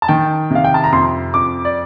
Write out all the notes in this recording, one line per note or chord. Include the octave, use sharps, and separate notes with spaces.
A5
D#3 G5
C3 F5
G5
A5
A#5
F2 C6
F2 D6
D5